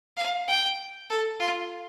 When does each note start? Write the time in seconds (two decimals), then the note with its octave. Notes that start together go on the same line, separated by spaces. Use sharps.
0.17 F5
0.48 G5
1.10 A4
1.40 F4